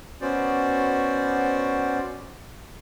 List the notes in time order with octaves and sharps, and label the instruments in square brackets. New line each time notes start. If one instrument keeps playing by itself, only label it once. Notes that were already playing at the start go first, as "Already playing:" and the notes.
[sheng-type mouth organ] B3 C#4 F#4 C5 D5